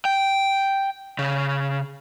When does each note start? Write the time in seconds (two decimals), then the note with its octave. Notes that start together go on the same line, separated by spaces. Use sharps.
0.05 G5
1.19 C#3